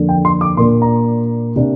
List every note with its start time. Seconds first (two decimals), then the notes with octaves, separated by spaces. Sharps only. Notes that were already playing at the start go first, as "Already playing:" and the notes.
Already playing: F2 D3 A#3 D4
0.09 G5
0.25 C6
0.41 D6
0.57 A#2 A#3 D4 C6
0.82 A#5
1.56 C3 A#3 D4